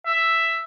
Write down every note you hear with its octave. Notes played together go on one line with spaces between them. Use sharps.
E5